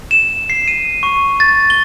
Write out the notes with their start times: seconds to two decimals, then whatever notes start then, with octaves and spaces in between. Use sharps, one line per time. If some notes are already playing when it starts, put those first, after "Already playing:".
0.11 E7
0.50 C7
0.68 D#7
1.03 C#6
1.40 A6
1.70 G7